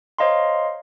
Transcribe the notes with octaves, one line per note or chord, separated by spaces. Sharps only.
C5 C#5 D#5 F5 A#5 C6